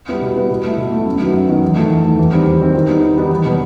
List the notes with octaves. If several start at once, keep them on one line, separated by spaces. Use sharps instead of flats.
G3 B3 E4
B2
G3 B3 E4
B2
A3 E4
B2
A3 E4
F#2
D#3 F#3 B3
F#2
D#3 F#3 B3
E2
D#3 A3
E2
D#3 A3
E2
D#3 G3 C4
E2
D#3 G3 C4
D#3
G3 B3 D#4
D#3
G3 B3 D#4
E2
B2 F#3 B3